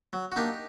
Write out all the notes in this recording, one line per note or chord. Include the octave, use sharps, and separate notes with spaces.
F#3
F#4
A#3 D4 D#4 G4